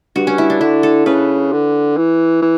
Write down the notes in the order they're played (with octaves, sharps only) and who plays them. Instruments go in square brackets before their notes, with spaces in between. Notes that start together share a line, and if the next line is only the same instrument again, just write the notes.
[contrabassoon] G2 [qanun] F#4
[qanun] C#4
E4
D4
[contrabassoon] D3 [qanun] E4
[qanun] A4
[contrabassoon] C#3 [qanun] B4
[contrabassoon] D3
E3
E3